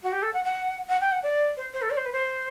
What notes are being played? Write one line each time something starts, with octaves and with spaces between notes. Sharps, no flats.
F#4
G4
A4
F#5
F#5
F#5
G5
F#5
D5
C5
C5
A4
D5
C5
B4
C5